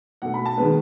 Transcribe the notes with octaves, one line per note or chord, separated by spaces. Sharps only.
B2 A3 F#5
B5
A5
D#3 G#3 B3 B4